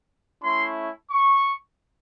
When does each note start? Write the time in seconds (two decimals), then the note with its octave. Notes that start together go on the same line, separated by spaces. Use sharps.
0.42 A3 C#4 E4 C6
1.10 C#6